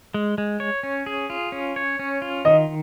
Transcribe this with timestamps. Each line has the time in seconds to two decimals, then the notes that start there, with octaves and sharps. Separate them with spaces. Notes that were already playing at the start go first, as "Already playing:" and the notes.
0.14 G#3
0.38 G#3
0.60 C#5
0.83 C#4
1.06 G#4
1.30 F4
1.52 C#4
1.76 C#5
1.99 C#4
2.22 F4
2.45 D#3 D#5